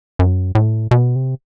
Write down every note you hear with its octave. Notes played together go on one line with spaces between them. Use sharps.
F#2
A2
B2
C3